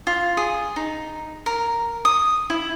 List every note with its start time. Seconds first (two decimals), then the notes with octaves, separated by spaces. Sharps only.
0.07 F4
0.37 G#4
0.76 D#4
1.46 A#4
2.05 D#6
2.50 E4